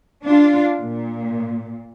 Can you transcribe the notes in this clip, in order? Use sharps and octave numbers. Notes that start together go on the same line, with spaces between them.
D4 F4
A#2